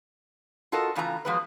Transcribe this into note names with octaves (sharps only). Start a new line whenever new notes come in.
F4 F#4 A4 A#4 D#5
A2 C#3 E3 F4 D#5 A#5
F3 F#3 G#3 B3 B4